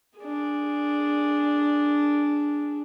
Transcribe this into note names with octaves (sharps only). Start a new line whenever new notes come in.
D4 G#4